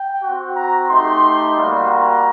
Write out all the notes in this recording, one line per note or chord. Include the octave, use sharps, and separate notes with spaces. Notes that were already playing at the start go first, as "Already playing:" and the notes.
Already playing: G5
C4 F#4
A#5
A3 D#4 G4 C6
G3 A#3 F#4
A#5